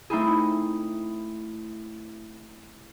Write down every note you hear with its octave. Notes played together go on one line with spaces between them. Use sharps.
A3 C4 D#4 E4 G#4